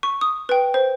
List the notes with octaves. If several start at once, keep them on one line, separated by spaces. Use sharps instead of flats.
C#6
D#6
B4 G5
C5